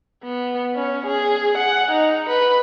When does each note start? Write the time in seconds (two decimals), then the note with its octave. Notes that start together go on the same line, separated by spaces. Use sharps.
0.24 B3
0.75 C#4
1.06 G#4
1.58 F#5
1.92 D#4
2.29 B4